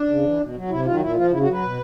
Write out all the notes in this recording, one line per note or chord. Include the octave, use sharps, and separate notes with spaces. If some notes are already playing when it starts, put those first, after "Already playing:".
Already playing: D4
C#3
E3
B2
F#3
C3 E4
D#3 F#3 F4
A#2 E4
F3 F4
C#3 E4
F#4
F#3 B4
B2